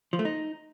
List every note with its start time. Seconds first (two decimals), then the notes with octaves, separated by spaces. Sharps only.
0.13 F3
0.19 A3
0.25 D#4